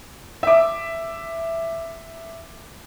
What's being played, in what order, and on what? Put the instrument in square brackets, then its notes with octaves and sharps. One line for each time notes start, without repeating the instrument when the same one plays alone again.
[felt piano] E5 D6